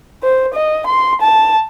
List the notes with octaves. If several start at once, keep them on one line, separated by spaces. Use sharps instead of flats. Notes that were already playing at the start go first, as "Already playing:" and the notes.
C5
D#5
C6
A5